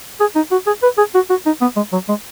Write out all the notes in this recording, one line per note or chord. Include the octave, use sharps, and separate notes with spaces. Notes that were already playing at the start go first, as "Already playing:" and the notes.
G#4
D#4
F#4
G#4
B4
G#4
F#4
F#4
D#4
B3
G#3
F#3
G#3